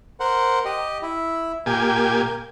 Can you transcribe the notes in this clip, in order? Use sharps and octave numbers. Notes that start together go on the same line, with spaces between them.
A#4 C5 F#5
G4 D#5
E4
A#2 G4 A#4 G#5